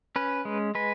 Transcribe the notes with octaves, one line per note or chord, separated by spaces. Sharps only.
C#4 B4
G#3
G#3 B4